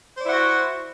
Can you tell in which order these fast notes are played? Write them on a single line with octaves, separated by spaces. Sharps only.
C5 D5 E4 F#5 F#4